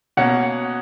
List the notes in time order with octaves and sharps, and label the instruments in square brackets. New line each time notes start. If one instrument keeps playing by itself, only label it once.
[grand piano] B2 A#3 C#4 F#5